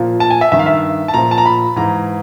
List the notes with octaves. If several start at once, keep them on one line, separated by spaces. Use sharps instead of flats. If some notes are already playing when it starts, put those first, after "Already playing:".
Already playing: A#2 F3
A5
G#5
E5
G2 D#3 E5
F5
E5
A5
A#2 F3 A#5
A5
A#5
B5
G#2 E3 A#5